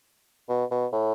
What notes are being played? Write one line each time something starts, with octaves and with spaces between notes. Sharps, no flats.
B2
B2
A2